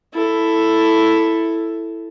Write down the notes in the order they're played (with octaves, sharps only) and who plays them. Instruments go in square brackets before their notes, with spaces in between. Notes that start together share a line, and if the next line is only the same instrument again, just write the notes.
[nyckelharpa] E4 A4